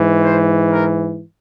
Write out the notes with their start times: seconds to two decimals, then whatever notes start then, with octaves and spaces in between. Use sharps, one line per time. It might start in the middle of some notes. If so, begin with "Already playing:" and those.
Already playing: G#2 E3
0.23 C5
0.71 A#4